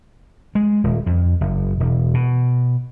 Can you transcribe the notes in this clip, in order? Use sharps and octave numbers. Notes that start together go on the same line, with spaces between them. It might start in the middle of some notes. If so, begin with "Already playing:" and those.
G#3
D#1
F2
F#1
E1
B2